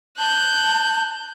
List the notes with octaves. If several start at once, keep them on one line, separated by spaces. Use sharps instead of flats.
A5 F#6 G6